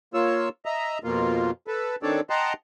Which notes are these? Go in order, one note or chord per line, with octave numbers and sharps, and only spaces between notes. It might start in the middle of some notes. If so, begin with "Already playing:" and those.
A#3 F4 C#5 E6
D#5 E5 A#5
F2 B2 A#3 F4
A4 B4
D#3 C4 D4 A4 C#5 D5
D#5 F#5 G5 A5 A#5 C6